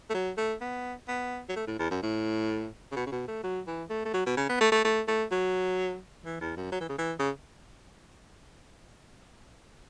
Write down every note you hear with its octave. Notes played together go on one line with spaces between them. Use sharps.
A3
F#3
A3
B3
B3
F#3
A3
A2
E2
F#2
A2
C#3
B2
C#3
B2
A3
F#3
E3
A3
A3
F#3
B2
C#3
B3
A3
A3
A3
A3
F#3
E3
E2
F#2
F#3
E3
C#3
E3
C#3